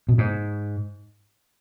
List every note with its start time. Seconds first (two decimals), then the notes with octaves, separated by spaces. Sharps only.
0.09 B2
0.18 G#2